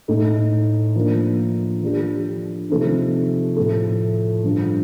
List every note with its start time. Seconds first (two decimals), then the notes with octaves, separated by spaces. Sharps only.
0.08 A2 A3 D#4
0.95 F3 A#3 D4
1.82 F3 A3 D4 G4
2.70 C3 F3 A3 C4 D#4
3.56 A2 F3 A3
4.44 G2 D3 F3